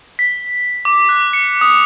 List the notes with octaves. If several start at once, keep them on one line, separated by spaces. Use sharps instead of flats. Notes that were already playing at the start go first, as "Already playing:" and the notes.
B6
D6
F#6
C#7
D#6